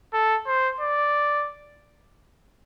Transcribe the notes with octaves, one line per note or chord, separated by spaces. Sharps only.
A4
C5
D5